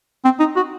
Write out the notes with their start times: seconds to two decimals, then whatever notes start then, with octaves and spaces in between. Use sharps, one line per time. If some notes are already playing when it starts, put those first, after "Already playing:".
0.25 C4
0.40 D#4
0.56 F#4